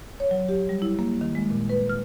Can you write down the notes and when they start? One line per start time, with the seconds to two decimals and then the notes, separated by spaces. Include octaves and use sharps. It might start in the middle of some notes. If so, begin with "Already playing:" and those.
0.20 C#5
0.31 F#3
0.49 G4
0.69 G3
0.82 E4
0.99 A#3
1.21 D#3
1.35 G#3
1.51 A#2
1.69 B4
1.89 F6